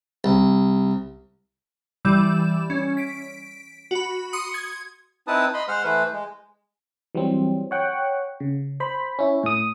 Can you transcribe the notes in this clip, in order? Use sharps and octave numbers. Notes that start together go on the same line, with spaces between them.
C2
E3 G3 D5 E7
C#4
B6 D7
F#4 B5
C6 D#6 C#7
G#6
C4 D#4 E4 B4 A5 D#6
D#5 B5 C6
G#3 C5 F#5 C6 F6
E3 A3 B4 C5
G#3
E3 F#3 G3 C4
C#5 F#5 G5
C#3
C5 B5
C#4 E4
A2 D#6